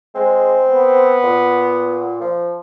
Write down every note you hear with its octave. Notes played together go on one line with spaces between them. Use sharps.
G#3 C4
B3
A#2
F3